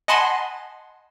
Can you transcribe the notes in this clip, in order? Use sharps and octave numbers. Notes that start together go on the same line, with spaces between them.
D#5 F#5 G#5 A5 B5 C6